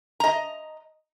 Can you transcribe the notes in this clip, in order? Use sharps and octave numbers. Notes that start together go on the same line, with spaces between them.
D#5 A#5